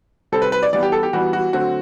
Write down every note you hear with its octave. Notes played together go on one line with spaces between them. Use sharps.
C3 G3 C4 A4
B4
B4
D5
E3 G3 B3 D5
G4
A4
G4
E3 G3 B3 F#4
F#4
D3 F#3 A3 C4 F#4